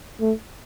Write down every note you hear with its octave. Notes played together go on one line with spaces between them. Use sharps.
A3